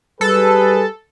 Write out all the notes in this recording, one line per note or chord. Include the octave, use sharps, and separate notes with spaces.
G3 G#4 A4 B4